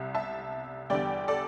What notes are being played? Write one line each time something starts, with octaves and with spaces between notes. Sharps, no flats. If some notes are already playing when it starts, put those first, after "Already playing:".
Already playing: C2 C3 G3 E5
E5 A5
E2 D3 G3 D5 G5
A4 D5